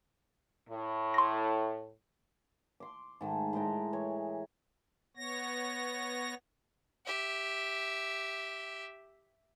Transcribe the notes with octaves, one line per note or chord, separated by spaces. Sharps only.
A2
C6 A#6
C6 D6
G#2 D#3 A3
A2 G#3 G5 A#5
E3 C#5
B3 C#5 A#6
G4 E5